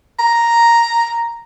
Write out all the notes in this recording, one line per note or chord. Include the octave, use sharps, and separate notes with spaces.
A#5